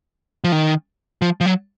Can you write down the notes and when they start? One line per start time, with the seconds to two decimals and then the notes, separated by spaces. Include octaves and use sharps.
0.44 F3
0.52 D#3
1.22 F3
1.41 F3
1.46 F#3